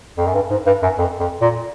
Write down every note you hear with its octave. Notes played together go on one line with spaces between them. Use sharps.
F2
F#2
G2
G#2
G2
F#2
F2
F2
A#2